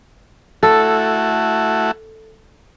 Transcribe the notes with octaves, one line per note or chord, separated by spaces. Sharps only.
A3 E4 F#4 A4